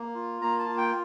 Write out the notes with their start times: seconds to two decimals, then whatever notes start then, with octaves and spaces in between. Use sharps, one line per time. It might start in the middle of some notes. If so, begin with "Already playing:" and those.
Already playing: A#3
0.15 F4
0.41 A#3 A#5
0.59 A5
0.68 F4
0.77 G5